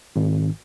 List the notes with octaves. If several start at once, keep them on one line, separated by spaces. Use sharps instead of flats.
G#1